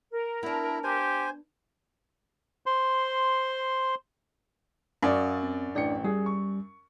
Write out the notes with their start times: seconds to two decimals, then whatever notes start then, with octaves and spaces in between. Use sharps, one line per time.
0.12 A#4
0.43 B3 D4 E4
0.84 G4 C5 G#5
2.66 C5 C6
5.03 F#2 F#4 D5 F5 D#6
5.43 C4
5.75 A1 D4 D5 G5 C#7
6.04 G3 G#4
6.26 C#6